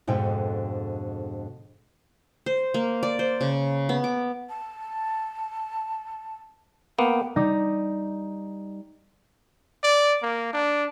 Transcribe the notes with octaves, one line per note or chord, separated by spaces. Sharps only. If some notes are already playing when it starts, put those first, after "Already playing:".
F2 G#2 B2 D3 G5
C5
A#3
D5
C5
C#3
B3
D6
A5
A#3 B3 G5
G3 D#4 D6 D#6
D5
A#3
D4